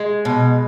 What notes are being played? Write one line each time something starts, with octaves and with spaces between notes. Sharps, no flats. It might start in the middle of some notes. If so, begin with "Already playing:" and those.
Already playing: G#3
B2